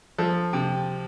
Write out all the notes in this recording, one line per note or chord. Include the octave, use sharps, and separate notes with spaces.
F3 A4
C3